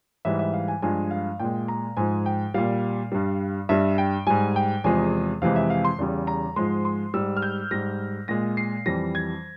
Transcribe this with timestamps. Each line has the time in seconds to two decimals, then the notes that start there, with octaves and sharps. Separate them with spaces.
0.25 G#2 E3 G3 E5
0.39 E5
0.54 F5
0.68 G#5
0.82 G2 F3 G#3 G#5
1.11 F5
1.39 A#2 G#3 G5
1.68 A#5
1.97 G#2 F3 G#3 G#5
2.26 G5
2.54 A#2 G3 F5
3.12 G2 G3
3.69 G2 G3 E5
3.98 G5
4.27 G#2 G3 G#5
4.56 G5
4.84 E2 C3 F3 G#3 G#5
5.42 F2 C3 E3 G#3 F5
5.56 E5
5.70 F5
5.85 C6
5.99 E2 C#3 G3
6.27 A#5
6.56 G#2 F3 G#3 C6
6.85 C6
7.14 G#2 G3 E6
7.37 F6
7.42 G6
7.71 G#2 G3 A#6
8.28 A#2 G#3 A#6
8.57 C7
8.86 F2 E3 G3 A#6
9.15 G#6